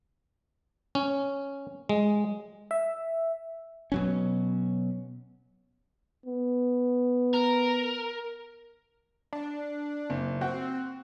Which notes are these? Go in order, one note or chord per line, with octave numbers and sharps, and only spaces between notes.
C#4
G#3
E5
B2 F#3 C#4
B3
A#4
D4
F#1
C4 F#4